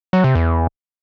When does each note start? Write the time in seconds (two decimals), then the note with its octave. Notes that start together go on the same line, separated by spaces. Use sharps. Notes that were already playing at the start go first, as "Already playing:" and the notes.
0.13 F#3
0.24 C3
0.35 E2